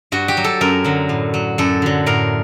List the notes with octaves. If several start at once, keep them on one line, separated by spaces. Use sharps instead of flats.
G2 F#4
G4
F#3
A4
F#2 A#4
D3 F#3
A2
F#3
F#2 A4
D3 F#3
A2 A#4